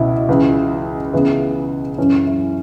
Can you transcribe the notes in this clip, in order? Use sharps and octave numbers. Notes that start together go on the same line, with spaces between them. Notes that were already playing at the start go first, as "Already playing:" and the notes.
Already playing: C#2 B2 E4
C#2 C#3 E3
C#2 C#3 E3 B3
F#2 E3 C#4
E4